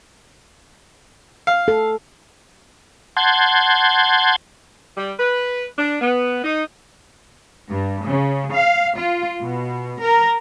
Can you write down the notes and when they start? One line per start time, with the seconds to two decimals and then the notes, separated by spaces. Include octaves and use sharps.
1.47 F5
1.68 A4
3.17 F#5 A5 C6 G6 G#6
4.97 G3
5.20 B4
5.79 D4
6.02 B3
6.44 D#4
7.70 G2
8.07 C#3
8.52 F5
8.99 F4
9.42 B2
10.00 A#4